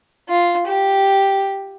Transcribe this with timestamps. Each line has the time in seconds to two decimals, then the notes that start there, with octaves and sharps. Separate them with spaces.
0.29 F4
0.67 G4